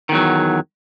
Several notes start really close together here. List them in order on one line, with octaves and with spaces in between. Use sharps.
D#3 E2 F#3